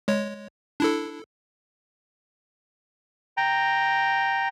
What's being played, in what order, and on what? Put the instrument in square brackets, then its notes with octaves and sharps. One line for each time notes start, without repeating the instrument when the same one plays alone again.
[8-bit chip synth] G#3 C#5
D4 E4 A4
[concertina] G5 A#5